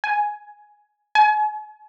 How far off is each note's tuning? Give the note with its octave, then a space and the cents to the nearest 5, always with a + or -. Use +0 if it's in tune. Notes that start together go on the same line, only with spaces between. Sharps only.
G#5 +15
G#5 +40